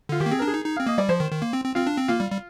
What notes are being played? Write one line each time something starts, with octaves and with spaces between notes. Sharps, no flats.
D3 F4
D#3 G4
A#3
C4 G#4
A#4
D4
G#4
D#4
D#4
C4 F5
A#3 D#5
G3 D5
F3 C5
D#3
D#3
A#3
C4
C4
C4 F4
D4
C4
A#3 F4
G3
G3